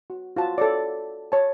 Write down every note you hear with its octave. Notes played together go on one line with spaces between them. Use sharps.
F#4
F4 F#4 A5
A4 C#5 D5
C#5 A5